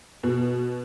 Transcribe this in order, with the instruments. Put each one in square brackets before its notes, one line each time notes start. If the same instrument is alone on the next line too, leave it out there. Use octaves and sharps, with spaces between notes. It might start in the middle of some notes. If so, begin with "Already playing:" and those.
[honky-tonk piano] B2